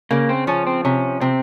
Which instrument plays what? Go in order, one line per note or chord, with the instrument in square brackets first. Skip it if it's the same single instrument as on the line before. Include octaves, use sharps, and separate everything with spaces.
[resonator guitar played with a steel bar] C#3 [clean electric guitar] A#3
[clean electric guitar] C4
[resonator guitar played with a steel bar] F3 [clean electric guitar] C#4
[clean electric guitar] C4
[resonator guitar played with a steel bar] C3 [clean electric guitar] C#4
[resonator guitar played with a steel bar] C3 [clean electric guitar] C4